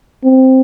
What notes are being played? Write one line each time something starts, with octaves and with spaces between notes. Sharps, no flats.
C4